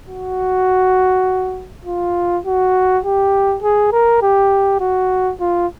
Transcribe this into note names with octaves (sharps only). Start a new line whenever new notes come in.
F#4
F4
F#4
G4
G#4
A#4
G4
F#4
F4